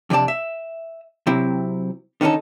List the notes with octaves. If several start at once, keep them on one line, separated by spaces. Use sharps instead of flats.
F2 C3 D4 D5 A5
E5
C3 F#3 C4 E4
D3 D#3 C#4 D#4 A4